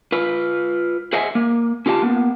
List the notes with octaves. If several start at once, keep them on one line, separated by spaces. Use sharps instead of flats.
F4 B4
G#4 C5 D#5 E5 F#5 G#5
A#3
C#4 F4 G4 D#5 A5
A#3 B3